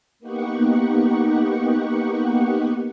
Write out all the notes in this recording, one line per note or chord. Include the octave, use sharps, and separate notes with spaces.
A#3 B3 D#4 G4 F#5 C#6